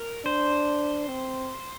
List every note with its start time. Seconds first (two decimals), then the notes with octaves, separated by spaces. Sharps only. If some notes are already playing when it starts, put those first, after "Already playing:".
Already playing: A#4
0.25 D4 C5
1.08 C4